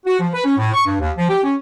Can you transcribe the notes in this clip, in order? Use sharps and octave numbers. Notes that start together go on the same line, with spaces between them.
F#4
F3
B4
C#4
A2
C#6
G2
D#2
F3
G4
C#4